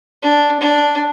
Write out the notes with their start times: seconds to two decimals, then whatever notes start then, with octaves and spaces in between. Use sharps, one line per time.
0.22 D4
0.60 D4